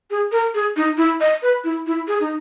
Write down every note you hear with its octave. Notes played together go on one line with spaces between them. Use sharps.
G#4
A#4
G#4
D#4
E4
D#5
B4
E4
E4
G#4
D#4